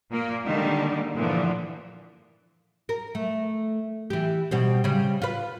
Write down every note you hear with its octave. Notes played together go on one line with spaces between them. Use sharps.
A#2 A#3
D3 D#3 G3 G#3 A#3
G2 A#2 D3 E3 F3
A#4
A3
E3 G4
B2 G3 C4
C#3 G3
F4 B4